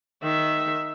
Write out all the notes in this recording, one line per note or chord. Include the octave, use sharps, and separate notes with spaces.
D#3 E5